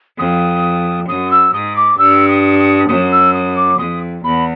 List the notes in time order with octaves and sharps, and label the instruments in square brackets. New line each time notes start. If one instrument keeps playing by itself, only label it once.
[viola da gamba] F2 [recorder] D#6
[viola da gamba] F#2 [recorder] D#6
[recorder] E6
[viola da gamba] G#2 [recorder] D#6
[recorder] D6
[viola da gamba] G2 [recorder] E6
[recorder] D#6
D#6
[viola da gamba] F#2 [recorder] D#6
[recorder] E6
D#6
D6
[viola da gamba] F2 [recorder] D#6
[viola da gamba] E2 [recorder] B5